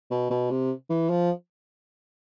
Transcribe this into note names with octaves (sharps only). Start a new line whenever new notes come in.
B2
B2
C3
E3
F3